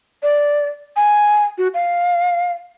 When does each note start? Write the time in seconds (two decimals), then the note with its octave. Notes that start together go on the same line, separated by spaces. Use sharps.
0.23 D5
0.96 G#5
1.58 F#4
1.74 F5